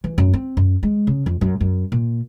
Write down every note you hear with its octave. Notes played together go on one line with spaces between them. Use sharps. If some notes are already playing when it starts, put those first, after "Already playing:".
E3
F#2
C4
F#2
G#3
C#3
F2
F#2
F#2
A#2